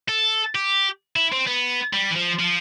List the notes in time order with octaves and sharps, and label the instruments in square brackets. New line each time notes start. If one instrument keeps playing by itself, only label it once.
[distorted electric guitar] A4
G4
E4
C4
B3
G3
E3
F3
F3